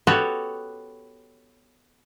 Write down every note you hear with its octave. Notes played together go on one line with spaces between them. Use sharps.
B3 F#4 G4 A4 C#5